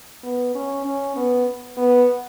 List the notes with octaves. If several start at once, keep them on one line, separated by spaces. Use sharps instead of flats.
B3
C#4
C#4
B3
B3